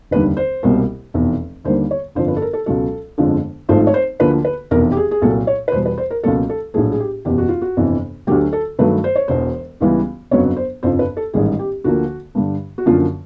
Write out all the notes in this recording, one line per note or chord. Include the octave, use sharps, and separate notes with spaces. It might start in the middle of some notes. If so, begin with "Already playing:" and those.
F1 D#2 D3 G3 B4
C5
C2 B2 G3 A#3
F1 E2 B2
D#2 D3 G3 A#3 C5
C#5
G1 F2 D3 F3 C5
B4
A4
A#4
A4
C#2 B2 F#3 A4
G1 F2 D3 F3 G#3
G#1 G#2 F3 A3 C5
C#5
C5
D2 D3 F3 A#3 B4
B4
F1 E2 B2 A#4
G4
G#4
G#4
C2 A#2 F#3 A4
C#5
B4
E2 B2 G3 C5
B4
C5
A#4
C#2 B2 F#3 A#3 A4
A4
A#1 A2 F#3 A3 G#4
G#4
G4
F#1 E2 B2 G4
F#4
F4
F#4
G1 F2 C3 E3
D2 D3 F#3 G4
A4
G2 D#3 F#3 A3 B4
C5
C#5
E1 E2 B2 C5
C#2 C#3 E3 G3 B3
G1 F2 C#3 F#3 B3 C#5
C5
G1 F2 C#3 F3 C5
B4
A4
A1 G#2 D#3 G3 G#4
G4
D2 D3 F3 A#3 F#4
G2 D3 G3
F#4
F#2 D3 F3 A#3 F4